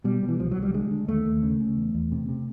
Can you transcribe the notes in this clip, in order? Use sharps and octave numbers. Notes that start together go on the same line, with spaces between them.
B2 G3
B2
E3
C2 F3
F#3
C2
G3
D3 G#3
D3
D#2 A3
D#2
C#3
C#3
E2
E2
C3
C3